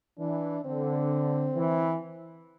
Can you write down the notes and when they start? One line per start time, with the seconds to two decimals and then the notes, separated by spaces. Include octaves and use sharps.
0.19 E3 D4
0.65 D3 C4
1.56 E3